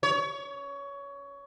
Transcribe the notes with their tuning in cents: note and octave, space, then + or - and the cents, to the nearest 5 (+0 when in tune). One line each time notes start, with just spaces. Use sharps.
C#5 +20